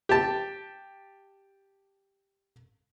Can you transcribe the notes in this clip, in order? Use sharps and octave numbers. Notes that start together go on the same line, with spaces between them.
G4 A5